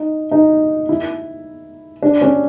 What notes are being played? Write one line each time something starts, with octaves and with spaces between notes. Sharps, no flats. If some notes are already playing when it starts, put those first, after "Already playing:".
Already playing: D#4
D#4
E4
D4
C#4